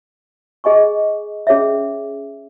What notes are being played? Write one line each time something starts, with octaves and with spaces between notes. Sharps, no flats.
G#4 D#5 G#5 C#6
C#4 G#4 C#5 E5